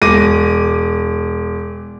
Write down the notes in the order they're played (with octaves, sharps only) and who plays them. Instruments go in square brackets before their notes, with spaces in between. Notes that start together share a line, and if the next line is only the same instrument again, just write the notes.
[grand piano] E1 D6 A#6 D#7